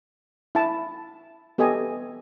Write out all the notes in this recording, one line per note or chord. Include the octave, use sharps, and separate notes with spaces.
E4 A5
B3 G4 A4 D#5 G#5